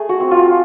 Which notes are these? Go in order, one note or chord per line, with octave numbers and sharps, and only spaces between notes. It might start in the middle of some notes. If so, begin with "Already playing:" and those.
Already playing: A3 G#4
F#4
C4
F4